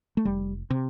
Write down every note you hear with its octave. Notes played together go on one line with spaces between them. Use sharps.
A3
F1 G3
C3